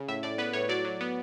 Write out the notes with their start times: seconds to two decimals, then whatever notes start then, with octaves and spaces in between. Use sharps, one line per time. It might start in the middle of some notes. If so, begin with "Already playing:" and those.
Already playing: C#3
0.08 A2 E5
0.23 A2 D5
0.38 B3 B4
0.53 A2 C#5
0.69 F#3 D5
0.85 F#3
1.01 B3